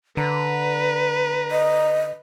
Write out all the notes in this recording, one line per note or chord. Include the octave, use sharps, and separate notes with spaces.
D3 B4 A#5
D#5